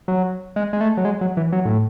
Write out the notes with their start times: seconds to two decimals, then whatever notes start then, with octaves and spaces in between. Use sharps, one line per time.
0.08 F#3
0.56 G#3
0.73 G#3
0.81 A3
0.97 F#3
1.05 G#3
1.21 F#3
1.37 E3
1.52 F#3
1.65 A2